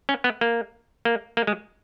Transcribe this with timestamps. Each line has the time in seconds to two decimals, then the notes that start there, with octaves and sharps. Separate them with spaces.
0.09 C#4
0.24 B3
0.41 A#3
1.05 A#3
1.37 A#3
1.47 G#3